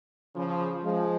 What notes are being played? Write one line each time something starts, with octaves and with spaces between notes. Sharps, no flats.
C#3 F3
F3 G#3